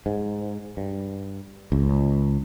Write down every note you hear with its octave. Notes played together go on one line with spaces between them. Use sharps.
G#2
G2
C#2